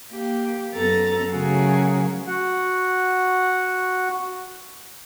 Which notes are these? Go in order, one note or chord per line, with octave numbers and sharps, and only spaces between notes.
A#3 G4
F#2 B3 A4 A#5 A6
C#3 F#3 A3 F#4 G#4 A#4
F#4 F#5